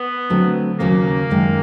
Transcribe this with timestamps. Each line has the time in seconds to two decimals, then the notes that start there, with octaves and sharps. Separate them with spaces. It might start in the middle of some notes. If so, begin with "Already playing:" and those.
Already playing: B3
0.30 D3 F#3 A3 C4
0.80 D#2 C#3 F#3 A#3
1.30 F#2 D#3 G#3